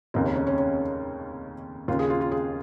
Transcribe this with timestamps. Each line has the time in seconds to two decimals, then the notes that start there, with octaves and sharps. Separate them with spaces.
0.14 F1 D#2 C#3 D#4
0.25 C#4
0.35 C#4
0.47 C#4
0.58 C#4
1.88 D#2 C#3 F4
1.99 G#4
2.10 F4
2.21 F4
2.32 G#4